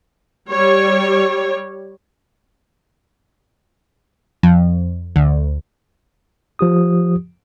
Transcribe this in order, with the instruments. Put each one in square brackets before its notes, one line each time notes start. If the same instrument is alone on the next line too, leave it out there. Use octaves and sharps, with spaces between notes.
[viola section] G3 C#5
[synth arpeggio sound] F2
D2
[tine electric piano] F3 G4 D#6